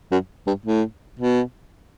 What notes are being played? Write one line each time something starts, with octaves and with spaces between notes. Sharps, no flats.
F#2
G2
A2
B2